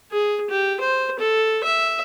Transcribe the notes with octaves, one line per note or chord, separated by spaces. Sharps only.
G#4
G4
C5
A4
E5